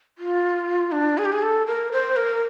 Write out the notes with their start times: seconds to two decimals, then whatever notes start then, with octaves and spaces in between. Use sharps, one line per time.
0.18 F4
0.92 D4
1.18 G#4
1.25 G4
1.33 G#4
1.42 A4
1.67 A#4
1.92 C5
2.16 A#4